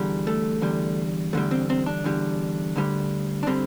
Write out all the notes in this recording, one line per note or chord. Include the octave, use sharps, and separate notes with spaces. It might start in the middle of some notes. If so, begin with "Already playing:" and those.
Already playing: E2 D3 G3
A3
E2 D3 G3
E2 D3 G3 A3
C4
C4
D4
E2 D3 G3
D2 D3 G3
D4
D3 G3 C4